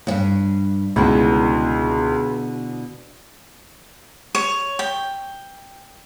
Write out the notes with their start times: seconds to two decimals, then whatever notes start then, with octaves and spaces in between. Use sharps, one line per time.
0.07 E2 G2
0.96 C#2 B2 D3 E4
4.35 C#5
4.79 G5